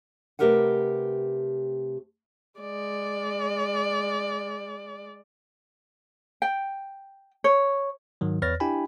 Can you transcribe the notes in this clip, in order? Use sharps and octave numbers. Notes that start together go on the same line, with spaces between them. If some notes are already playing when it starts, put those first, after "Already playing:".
C3 A3 G4 A#4 B4 F#5
G#3 D5
G5
C#5
G#2 D#3 F#3
E2 B4 C#5 F6 A6 A#6
D4 E4 G4 G5 G#5 B5